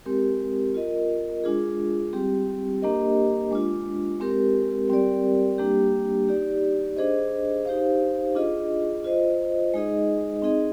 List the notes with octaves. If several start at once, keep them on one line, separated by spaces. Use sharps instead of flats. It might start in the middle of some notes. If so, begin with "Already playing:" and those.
G#3 C4 G4 A#4
F4 A#4 D#5
G#3 D4 F4 G#4
G3 C4 G4
A#3 D4 G4 A#4 D#5
G#3 D4 F4
G#3 C4 G4 A#4
G3 C4 G4 A#4 D5
G3 A#3 D4 G4
D#4 G4 D5
D4 G#4 C5 D#5
D#4 G4 C5 F5
D4 F4 G#4 D#5
F4 C5 D#5
G#3 D#4 G#4 D#5
C4 D#4 G#4 D#5